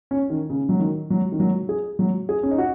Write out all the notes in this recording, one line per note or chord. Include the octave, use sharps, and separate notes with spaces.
C#4
D#3
C#3
F#3
D#3
F#3
D#3
F#3
G#4
F#3
G#4
C#4
D#4
F#4